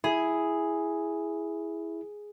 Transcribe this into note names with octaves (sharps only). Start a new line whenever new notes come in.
E4 G#4